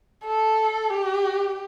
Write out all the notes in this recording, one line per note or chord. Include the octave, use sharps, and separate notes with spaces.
A4
G4